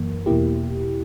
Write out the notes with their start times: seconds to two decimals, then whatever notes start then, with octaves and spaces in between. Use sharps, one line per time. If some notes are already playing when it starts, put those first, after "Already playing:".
Already playing: F#2 E3 A#3
0.26 E2 B2 A#3 E4 G4